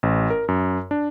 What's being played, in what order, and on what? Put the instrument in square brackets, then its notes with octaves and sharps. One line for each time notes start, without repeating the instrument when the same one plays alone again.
[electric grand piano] A1
A#4
F#2
D4